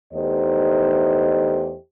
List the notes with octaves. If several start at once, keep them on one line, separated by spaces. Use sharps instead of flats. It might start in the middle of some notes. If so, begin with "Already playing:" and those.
E2 A3 D#4 G4 C5 D#5